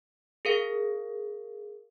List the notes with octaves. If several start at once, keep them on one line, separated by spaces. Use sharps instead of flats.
G#4 A#4 F5